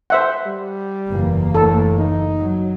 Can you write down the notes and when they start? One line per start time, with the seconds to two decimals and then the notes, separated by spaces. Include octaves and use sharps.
0.10 C5 E5 F#5
0.46 G3
1.08 F#1 E2 A#3
1.55 A2 A4
1.99 D#4
2.38 F#3